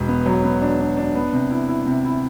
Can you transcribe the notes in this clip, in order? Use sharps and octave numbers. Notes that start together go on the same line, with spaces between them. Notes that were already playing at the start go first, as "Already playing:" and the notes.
Already playing: E1
B3
F#3
B3
D4
D4
D4
B3
C3
E4
E4
C3
E4